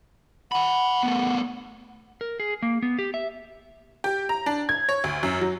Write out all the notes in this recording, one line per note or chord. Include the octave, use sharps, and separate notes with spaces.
F#5 G#5 B5
A3 B3
A#4
G#4
A#3
B3
G4
E5
G4
A#5
D4
G#6
C#5
D2
F#2
F#3